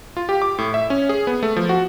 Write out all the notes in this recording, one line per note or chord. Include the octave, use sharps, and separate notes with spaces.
F4
G4
D6
A2
E5
C#4
G#4
B3
A3
F3
F#4